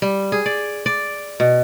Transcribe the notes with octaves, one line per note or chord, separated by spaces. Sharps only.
G3
G#4
D5
D5
B2